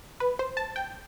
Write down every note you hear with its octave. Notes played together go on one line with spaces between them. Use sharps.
B4
C5
A5
G5